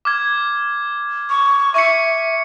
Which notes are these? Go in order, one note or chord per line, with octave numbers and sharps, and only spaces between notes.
D6 F6 G#6
C#6
E5 C#6 C#7